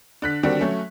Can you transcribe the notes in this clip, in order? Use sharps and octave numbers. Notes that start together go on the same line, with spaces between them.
D3 F#6 B6
D3 D#3 G3 C4 D4 F#4
F#3 A3 C#4